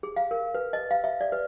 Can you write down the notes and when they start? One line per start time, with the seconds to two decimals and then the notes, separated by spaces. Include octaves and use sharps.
0.03 G#4
0.16 F5
0.31 A#4
0.54 B4
0.73 D#5
0.91 F5
1.04 E5
1.21 D5
1.32 B4